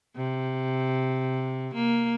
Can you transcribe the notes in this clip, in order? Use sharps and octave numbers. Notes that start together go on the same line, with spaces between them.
C3
A#3